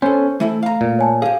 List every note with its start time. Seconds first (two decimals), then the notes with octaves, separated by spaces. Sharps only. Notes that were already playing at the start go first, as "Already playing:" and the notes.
0.02 B3 C#4 A4 C5
0.40 E3 A3 E4 A4
0.63 F5 A#5
0.81 A#2
0.99 C#5 G#5 A5
1.22 G4 G#4 F5